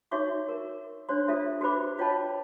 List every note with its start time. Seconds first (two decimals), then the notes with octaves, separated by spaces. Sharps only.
0.11 D#4 F#4 C#5 E5 C#6 D6
0.49 A#4
1.09 D4 C5 C#5 C6
1.28 F4 G4 A4 E5
1.61 F#4 G4 B4 C5 B5 D6
1.98 F4 C#5 D#5 G5 A5 B5